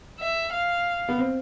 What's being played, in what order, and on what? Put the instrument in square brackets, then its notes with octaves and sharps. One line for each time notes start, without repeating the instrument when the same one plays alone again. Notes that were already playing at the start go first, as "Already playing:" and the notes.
[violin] E5
F5
[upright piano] B3
C4